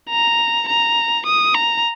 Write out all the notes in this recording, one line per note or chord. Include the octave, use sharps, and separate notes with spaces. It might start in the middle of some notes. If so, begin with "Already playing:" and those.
A#5
A#5
D#6
A#5